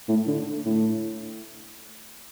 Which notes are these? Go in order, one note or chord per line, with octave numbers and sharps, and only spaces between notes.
A2
D3
A2